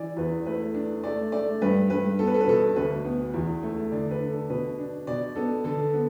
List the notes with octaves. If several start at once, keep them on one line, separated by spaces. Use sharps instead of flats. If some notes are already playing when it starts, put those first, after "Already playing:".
Already playing: E3 D5
E2 B4
A3 B4
D4
A3 D5
A3 D5
G2 B4
G2 B4
B3 A4
B4
A4
B4
B2 A4
D2 B4
B3
E2
A3
D3 D5
B4
D4
A4
B2 B4
D4
B2 D5
B3 A4
D3 A4
B3